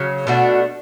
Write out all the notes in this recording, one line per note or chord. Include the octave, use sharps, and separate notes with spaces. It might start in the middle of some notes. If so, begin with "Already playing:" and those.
Already playing: C#3 F#3
B2 A3 D4 F#4